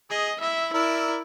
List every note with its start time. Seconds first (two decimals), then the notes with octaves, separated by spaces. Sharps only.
0.10 G#4 D#5
0.40 E4 E5
0.73 E4 A#4 D5 E5